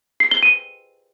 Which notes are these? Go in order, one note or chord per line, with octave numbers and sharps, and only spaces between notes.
C7
G7
D#7